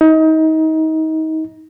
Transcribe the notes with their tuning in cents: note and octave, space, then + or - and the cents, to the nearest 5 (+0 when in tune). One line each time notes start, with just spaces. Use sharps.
D#4 +30